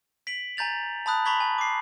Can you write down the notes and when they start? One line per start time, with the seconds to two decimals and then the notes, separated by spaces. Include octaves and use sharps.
0.27 B6 D7 F#7
0.57 G#5 A#5 G6 A6 F7
1.06 A5 B5 D#6 F#6
1.25 A#5 B5 C#6 G#6 B6 F#7
1.40 G#5
1.58 D6 C7